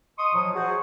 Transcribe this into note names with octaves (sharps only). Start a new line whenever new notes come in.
D#5 C6 C#6 D#6
A#2 F3 F#3
F#4 G#4 C5